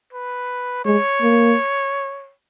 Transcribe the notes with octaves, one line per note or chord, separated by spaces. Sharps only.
B4
G#3 C#5
A#3